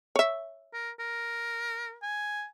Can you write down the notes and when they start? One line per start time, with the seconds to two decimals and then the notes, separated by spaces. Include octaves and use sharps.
0.16 C#5 E5
0.74 A#4
1.00 A#4
2.03 G#5